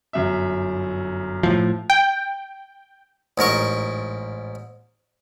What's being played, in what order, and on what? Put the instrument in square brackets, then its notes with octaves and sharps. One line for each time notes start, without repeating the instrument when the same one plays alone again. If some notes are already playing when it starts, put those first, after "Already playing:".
[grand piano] G1 F#2 E5
[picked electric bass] A2 F3
[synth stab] G5
[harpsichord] A1 G#2 A#4 C#6